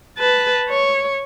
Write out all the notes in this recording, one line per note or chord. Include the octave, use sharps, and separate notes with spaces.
B4 A5
C#5